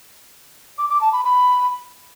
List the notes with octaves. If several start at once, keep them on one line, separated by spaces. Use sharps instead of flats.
D6
D6
A5
B5
B5